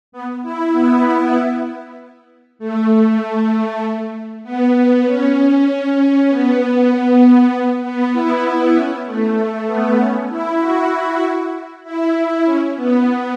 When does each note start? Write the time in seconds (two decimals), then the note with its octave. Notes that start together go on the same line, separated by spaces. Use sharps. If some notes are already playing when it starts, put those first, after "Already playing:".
0.12 B3
0.42 E4
0.73 B3
2.59 A3
4.43 B3
4.74 B3
5.06 C#4
6.29 B3
7.52 B3
7.83 B3
8.13 E4
8.44 E4
8.74 C#4
9.05 A3
9.37 A3
9.67 B3
9.98 C#4
10.29 E4
10.59 F#4
11.84 E4
12.45 C#4
12.75 B3